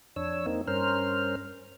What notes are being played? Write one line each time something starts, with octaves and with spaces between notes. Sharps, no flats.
F2 D4 C#5 E6
A#3 C4 D#4
G2 C#4 A#4 C5 F6